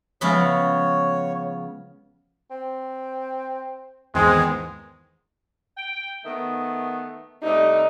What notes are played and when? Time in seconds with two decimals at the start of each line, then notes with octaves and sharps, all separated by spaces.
0.21 C#3 F3 G#3 B3 C#5 E5 F5
2.51 C4
4.15 E2 G#2 D#3 G#3 C4
5.77 G5
6.25 D#3 A3 B3
7.43 C3 G3 A3 D#4